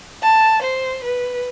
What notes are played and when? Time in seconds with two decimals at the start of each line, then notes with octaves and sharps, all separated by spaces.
0.23 A5
0.62 C5
1.04 B4